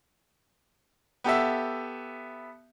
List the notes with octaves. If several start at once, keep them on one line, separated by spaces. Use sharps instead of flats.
B3 G4 A4 E5